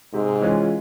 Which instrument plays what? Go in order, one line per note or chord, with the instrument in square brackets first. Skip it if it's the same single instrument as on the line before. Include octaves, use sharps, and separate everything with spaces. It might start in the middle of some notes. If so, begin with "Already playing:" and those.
[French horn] G#2 [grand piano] C3
[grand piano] E3 G#3 C#4 F4